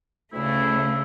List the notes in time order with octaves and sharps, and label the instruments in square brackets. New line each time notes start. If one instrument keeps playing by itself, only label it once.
[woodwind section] D2 E4 [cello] C#3 A3